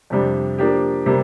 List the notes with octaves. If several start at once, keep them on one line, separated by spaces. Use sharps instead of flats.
F2 C3 G3 D4
F3 A#3 D4 G4
C3 G3 A#3